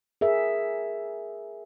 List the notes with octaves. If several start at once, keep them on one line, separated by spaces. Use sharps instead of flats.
G#4 A#4 E5